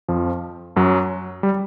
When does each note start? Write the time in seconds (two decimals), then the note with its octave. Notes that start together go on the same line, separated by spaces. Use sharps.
0.08 F2 F3
0.76 F#2 F#3
1.43 G3